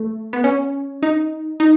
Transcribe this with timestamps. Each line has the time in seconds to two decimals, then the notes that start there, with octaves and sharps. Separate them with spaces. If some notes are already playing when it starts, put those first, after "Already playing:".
Already playing: A3
0.33 B3
0.44 C#4
1.02 D#4
1.60 D#4